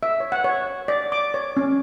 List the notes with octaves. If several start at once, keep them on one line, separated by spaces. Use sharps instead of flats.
E5
C#5
F#5
C#5
D5
D6
C#5
C#4